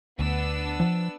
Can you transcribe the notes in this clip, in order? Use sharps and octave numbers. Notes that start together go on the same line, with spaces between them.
D2 B3 D4 E6
F3